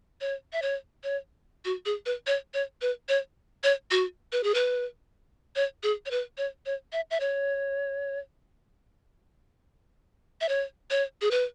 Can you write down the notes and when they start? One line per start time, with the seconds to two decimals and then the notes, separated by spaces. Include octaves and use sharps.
0.21 C#5
0.53 E5
0.62 C#5
1.03 C#5
1.65 F#4
1.86 G#4
2.06 B4
2.27 C#5
2.54 C#5
2.82 B4
3.09 C#5
3.64 C#5
3.91 F#4
4.32 B4
4.43 G#4
4.54 B4
5.56 C#5
5.83 G#4
6.06 C#5
6.11 B4
6.38 C#5
6.66 C#5
6.93 E5
7.11 E5
7.20 C#5
10.41 E5
10.49 C#5
10.90 C#5
11.21 G#4
11.31 B4